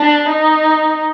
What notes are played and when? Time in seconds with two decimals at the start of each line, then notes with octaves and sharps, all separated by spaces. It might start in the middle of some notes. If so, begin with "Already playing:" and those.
Already playing: D4
0.29 D#4